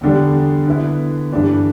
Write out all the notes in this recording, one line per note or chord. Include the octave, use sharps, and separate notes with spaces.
E2 D3 G3 D4
D3 B3 E4
G2 E3 A3 D4